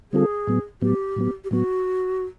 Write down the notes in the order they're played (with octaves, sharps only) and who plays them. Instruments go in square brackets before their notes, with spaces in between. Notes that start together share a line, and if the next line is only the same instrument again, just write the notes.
[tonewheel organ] D3 G3 C4 F4 A4 [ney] G#4
[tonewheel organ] A2 F#3 B3
[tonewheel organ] A2 F#3 B3 [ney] G4
[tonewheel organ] A2 F#3 B3
[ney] G4
[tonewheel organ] A2 F#3 B3 [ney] F#4